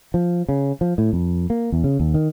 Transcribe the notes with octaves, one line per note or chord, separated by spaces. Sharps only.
F3
C#3
F3
A2
F2
A#3
E2
C#3
D#2
D#3